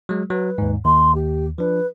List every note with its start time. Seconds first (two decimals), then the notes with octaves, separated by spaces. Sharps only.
0.09 F#3 G#3
0.30 F#3 B4
0.58 D#2 G#2
0.85 D#2 C6
1.15 G4
1.58 F3 D4 B4